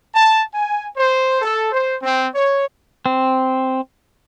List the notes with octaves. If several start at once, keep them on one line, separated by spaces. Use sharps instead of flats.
A5
G#5
C5
A4
C5
C4
C#5
C4